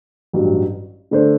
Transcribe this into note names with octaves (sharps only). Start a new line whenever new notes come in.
A1 G2 F#3
D3 A3 D4 A4 C5